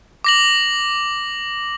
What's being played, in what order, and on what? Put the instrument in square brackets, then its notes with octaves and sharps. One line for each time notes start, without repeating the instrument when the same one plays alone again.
[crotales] D6 A#6 F#7